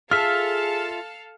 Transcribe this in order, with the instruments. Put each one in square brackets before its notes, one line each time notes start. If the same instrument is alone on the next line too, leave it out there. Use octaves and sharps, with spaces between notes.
[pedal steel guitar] F4 E5 [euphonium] G#4 [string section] A4 F5 A5 [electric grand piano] F6